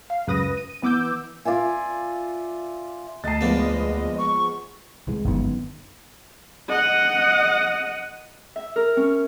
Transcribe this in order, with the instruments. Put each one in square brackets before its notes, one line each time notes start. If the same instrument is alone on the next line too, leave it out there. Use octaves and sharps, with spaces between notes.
[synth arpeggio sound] F5
C#2 F#2 B4 D#6 A#6 D#7
D#7
E3 B3 D6 E6 G6
[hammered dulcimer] F4 D5 E5 G#5
[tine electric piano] D2 C7 [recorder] D#5 [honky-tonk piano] A5 A6
[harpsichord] E2 A#3 D4 [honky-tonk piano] F3 G#3 B3
[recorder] C#6
[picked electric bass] C2 E3 G#3
[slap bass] G1 A#2 G#3 [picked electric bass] F#2 D#3 B3
[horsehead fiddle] D#5 F#5
[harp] E5
A#4
C#4